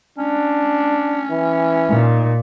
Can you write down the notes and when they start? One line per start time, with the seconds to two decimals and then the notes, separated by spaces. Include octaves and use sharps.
0.18 C#4 D4
1.31 E3
1.90 A#2 D#4